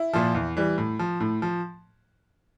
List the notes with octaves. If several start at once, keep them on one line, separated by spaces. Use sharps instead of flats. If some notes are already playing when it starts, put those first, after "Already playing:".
Already playing: E4
A#2 F3
E2
E3 G3
A2
F3
A2
F3